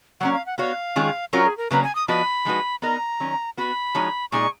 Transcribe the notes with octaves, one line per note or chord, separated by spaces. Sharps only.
F#3 A#3 C#4 F#5
F5
F#5
B3 F#4 C#5 F5
D#3 G#3 C#4 F4 G#4
F#3 C#4 F4 F#4 A#4 C#5
G#4
A#4
C#3 F#3 A#3 C#4 F#4 B4
G#5
D#6
F3 B3 F#4 B4 D#5 B5
F3 G#3 D#4 F#4 B4
B3 D#4 A#4 D#5 A#5
D#3 F#3 C#4
B3 F#4 B4 B5
F3 G#3 D#4 F#4 C#5
A#2 G#3 D#4 G#4 C#6